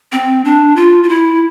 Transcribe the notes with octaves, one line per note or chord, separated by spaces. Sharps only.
C4
D4
F4
F4
E4